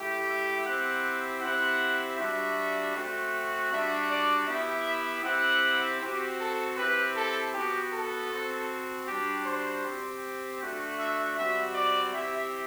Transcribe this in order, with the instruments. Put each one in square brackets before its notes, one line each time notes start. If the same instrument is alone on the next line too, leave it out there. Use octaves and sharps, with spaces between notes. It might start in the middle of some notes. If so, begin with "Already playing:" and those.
Already playing: [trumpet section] A3 E4 G4
E5
C4 E4 G4 F#5
C4 E4 G4 F#5
G3 D4 F#4 E5
A3 C4 F#4
G3 D4 F#4 E5
D5
B3 E4 G4 E5
C4 E4 G4 F#5
C4 F#4 G4
A4
C4 E4 G4 B4
A4
B3 F#4 G4
A4
C4 F#4
G3 D4 F#4 G4
C5
C4 G4
A3 D4 F#4
E5
G3 C4 F#4 E5
D5
C4 E4 G4 E5